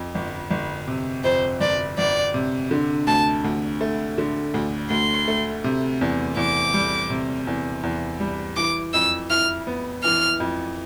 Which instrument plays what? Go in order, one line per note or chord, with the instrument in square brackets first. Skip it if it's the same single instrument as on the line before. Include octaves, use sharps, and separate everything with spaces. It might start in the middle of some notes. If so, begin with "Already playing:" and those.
Already playing: [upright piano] F2
G1
G1
C3
[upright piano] F2 [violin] C5
[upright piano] G1 [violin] D5
[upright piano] G1 [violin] D5
[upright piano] C3
D3
[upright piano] D2 [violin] A5
[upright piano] D2
A3
D3
D2
[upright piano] D2 [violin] C6
[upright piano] A3
C3
E2
[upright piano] E2 [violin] D6
[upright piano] G3
C3
E2
E2
G3
[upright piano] E3 [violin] D6
[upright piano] F2 [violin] E6
[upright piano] E4 [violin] F6
[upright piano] B3
[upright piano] E3 [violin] F6
[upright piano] F2